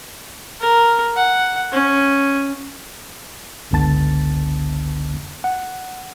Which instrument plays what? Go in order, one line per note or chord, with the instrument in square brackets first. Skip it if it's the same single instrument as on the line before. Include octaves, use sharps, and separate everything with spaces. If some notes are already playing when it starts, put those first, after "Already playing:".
[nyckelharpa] A#4
F#5
C#4
[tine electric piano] G1 C#2 D3 B3 A5 A6
F#5